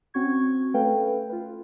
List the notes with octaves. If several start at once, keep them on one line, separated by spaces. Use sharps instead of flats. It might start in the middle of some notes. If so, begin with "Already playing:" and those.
C4 C#4 F#4 C#6 G#6
A3 C#4 A4 B4 F5 G5
F4 B4